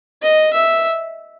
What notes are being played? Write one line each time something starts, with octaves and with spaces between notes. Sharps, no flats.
D#5
E5